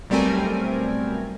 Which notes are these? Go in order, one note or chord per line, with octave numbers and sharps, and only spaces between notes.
B1 G3 A3 C4 A#4 G#5